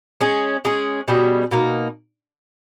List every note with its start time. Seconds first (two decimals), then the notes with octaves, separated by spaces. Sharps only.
0.21 G#3 C#4 G#4
0.65 G#3 C#4 G#4
1.08 B2 G3 C#4 G#4
1.51 B2 A#3 D#4